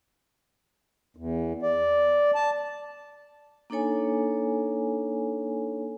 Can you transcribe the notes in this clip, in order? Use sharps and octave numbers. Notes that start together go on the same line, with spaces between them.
E2
D5
A5
A#3 D4 D#4 A4 C#5 G#5